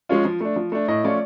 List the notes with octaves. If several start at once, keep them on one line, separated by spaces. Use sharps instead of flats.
F3 G#3 C#4 F4
F3
A3 D4
F3
A3 D4
A2 D#5
F3 A3 C#4 F4 D5